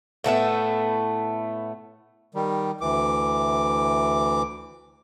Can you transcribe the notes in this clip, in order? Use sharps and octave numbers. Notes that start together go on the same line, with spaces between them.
A2 A3 B3 E5
D#3 G3
D2 E3 D6